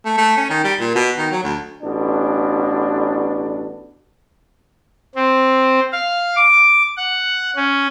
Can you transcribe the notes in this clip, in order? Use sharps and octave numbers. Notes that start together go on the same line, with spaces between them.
A3
A3
C#4
D#3
G3
A#2
B2
D#3
F#3
D2
A1 B2 D4
C4
F5
D6
F#5
C#4